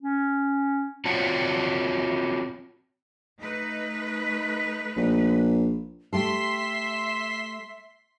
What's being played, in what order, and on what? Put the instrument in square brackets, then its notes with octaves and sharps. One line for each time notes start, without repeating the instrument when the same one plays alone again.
[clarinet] C#4
[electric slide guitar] C4 F4 F#4 C#5 A5
[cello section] A3 D#4 B4
[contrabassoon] A#1
[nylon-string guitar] A3 G4 A4 [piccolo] E5 [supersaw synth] C6 B6